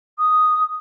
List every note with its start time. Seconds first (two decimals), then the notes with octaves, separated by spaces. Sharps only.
0.18 D#6